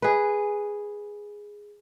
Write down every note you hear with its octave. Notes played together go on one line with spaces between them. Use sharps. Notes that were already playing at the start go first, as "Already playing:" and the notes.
G#4 B4